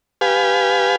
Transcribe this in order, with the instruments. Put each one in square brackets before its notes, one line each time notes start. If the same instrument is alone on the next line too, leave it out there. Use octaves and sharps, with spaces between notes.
[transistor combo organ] G4 B4 F5 G#5